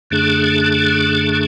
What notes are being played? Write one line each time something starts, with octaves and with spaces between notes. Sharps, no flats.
F#2 D3 A3 D4 G#4